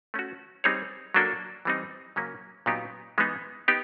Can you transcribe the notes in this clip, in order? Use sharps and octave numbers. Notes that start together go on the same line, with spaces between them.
A3 C#4 F#4
G3 C4 D#4 G#4 C#5
F#3 A#3 D4 F#4 A4
E3 G3 C4 D#4
C#3 F#3 A#3 C#4
A#2 F#3 B3 D#4 G4
E3 G#3 B3 D#4
B3 D#4 G4